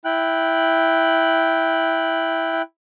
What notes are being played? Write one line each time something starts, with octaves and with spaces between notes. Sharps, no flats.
E4 G5 F#6